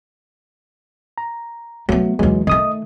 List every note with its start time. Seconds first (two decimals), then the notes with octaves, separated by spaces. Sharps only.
1.18 A#5
1.89 F#3 A3 B3
2.19 D#2 E3 F#3 G#3
2.47 D#3 A3 D#5 D#6